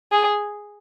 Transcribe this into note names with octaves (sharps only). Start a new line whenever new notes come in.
G#4